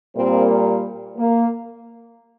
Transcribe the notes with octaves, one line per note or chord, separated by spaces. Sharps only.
A#2 G3 A#3 C4
A#3